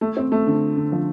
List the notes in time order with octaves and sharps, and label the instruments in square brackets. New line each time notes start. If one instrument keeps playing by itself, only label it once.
[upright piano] A3
C4
A3
D3
D3
F3